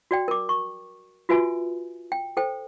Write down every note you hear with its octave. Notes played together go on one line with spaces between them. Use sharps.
F#4 D5 G5
A#4 D6
C#6
F4 F#4 B4 E5 G#5
G5
A4 C5 G5